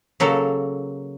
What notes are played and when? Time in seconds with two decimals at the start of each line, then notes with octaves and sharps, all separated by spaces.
0.20 C#3 F#3 A#3 A4